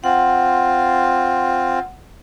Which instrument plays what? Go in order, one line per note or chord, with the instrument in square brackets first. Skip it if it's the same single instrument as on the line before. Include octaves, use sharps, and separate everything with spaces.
[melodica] C4 F4 [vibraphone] F#5